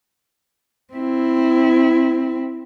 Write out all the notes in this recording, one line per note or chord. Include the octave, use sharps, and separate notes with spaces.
C4 E4